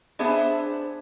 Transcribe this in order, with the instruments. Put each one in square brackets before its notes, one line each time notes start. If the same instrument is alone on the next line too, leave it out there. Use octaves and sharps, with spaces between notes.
[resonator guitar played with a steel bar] B3 D4 G#4 C5 E5